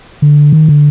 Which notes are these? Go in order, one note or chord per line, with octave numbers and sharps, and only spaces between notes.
D3
D#3
D3